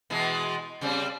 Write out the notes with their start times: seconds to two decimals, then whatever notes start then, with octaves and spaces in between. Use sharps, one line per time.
0.10 B2 E3 G#3
0.81 C#3 G3 C4